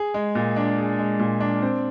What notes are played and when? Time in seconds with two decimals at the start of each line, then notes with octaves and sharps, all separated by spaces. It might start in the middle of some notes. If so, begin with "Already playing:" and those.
Already playing: G#4
0.14 G#3
0.35 A#2
0.56 D4
0.78 G#4
0.99 G#3
1.19 A#2
1.40 D4
1.62 C4